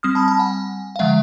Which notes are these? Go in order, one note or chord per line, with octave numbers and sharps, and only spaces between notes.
G3 C4 D#6 F6
A5 B5
A5 B5
F#5 G#5
F5
D3 F3 G#3 E5 F#5